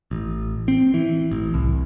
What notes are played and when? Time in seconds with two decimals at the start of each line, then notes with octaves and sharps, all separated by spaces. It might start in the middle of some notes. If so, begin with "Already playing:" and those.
0.11 A1
0.68 C4
0.94 E3
1.31 A1
1.54 C2